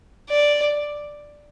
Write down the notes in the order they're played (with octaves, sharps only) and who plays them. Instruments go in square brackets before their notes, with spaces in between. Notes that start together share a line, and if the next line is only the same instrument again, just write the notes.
[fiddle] D5